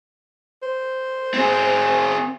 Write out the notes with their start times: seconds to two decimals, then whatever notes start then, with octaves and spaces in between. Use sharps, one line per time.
0.62 C5
1.34 C4 G#4